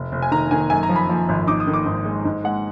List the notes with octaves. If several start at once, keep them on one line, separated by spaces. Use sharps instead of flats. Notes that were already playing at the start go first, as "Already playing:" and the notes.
Already playing: F1
F1
G#5
D#3 A#5
D#3 G#5
F#2 G#5
A#5
F3
B5
F3
G#1
D#4 D6
D#6
D#3
D6
G#2
G#3
G#2
G#3 F#5